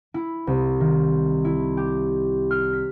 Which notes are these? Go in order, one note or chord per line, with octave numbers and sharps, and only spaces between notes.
E4
C2
D#3
E4
G4
F6
B6